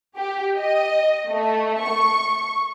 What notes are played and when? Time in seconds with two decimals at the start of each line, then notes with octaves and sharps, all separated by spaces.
0.18 G4
0.59 D#5
1.30 A3
1.85 C#6